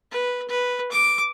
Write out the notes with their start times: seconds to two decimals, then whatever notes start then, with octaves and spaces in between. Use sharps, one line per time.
0.11 B4
0.48 B4
0.91 D6